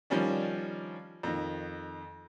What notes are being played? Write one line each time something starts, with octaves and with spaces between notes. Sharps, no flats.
D#3 F3 G3 C#4 D4
F2 D#3